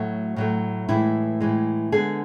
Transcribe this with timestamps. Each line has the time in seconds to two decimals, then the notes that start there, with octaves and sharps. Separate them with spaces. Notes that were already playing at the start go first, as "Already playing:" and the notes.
Already playing: A2 F#3 A3 F#4
0.36 A2 F#3 A3
0.88 A2 E3 G#3 E4
1.40 A2 E3 G#3
1.92 D3 G#3 B3 G#4